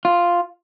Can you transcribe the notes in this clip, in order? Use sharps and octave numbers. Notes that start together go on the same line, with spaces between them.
F4